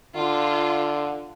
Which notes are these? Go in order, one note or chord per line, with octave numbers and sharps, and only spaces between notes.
D3 F4